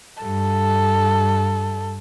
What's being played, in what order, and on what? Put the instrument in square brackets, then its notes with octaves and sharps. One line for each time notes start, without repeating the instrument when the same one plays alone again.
[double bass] G2 [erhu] A4